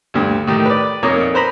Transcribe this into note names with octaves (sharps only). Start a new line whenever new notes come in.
D2 G2
A2 D#3 G4
B4 D5
F2 A#2 A#3 D#4 C#5 C#6
B4 C5 A#5 B5